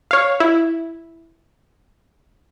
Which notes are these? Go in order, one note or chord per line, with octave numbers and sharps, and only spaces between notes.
C#5 F5
E4